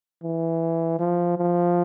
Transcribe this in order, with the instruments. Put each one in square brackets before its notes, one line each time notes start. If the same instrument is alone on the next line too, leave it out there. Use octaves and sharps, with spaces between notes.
[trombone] E3
F3
F3